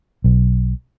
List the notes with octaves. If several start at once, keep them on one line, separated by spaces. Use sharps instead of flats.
B1